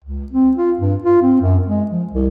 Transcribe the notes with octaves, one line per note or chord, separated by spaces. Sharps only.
C#2
C4
F4
G2
F4
C4
F#2
G#3
F3
C2